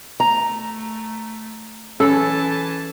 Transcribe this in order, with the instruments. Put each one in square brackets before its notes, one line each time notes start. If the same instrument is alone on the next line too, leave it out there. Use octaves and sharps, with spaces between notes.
[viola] A3 [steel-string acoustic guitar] A#5
[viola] E3 A5 [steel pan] C#4 [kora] A4